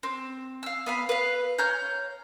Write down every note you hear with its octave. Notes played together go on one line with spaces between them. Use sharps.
C4
F5 E6
B3 F5 B5
B4 F5
C#5 A#5 F6 G6